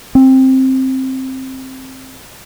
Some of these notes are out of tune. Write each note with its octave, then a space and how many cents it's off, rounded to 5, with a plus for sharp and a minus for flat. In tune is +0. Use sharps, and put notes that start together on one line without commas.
C4 +10